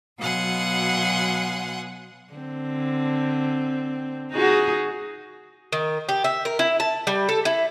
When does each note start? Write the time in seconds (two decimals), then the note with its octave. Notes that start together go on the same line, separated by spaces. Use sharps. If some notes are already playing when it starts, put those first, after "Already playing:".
0.18 B2 F#3 F5 F#5 G#5 C6
2.33 D3 C4
4.32 D#4 F#4 G#4
5.72 D#3
6.09 G4
6.24 E5
6.45 A#4
6.59 E4
6.80 A5
7.07 G3
7.29 A4
7.45 E4